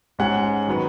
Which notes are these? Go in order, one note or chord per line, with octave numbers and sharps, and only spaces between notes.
G#2 G#3 C#4 F#5
D#3 F#3 B3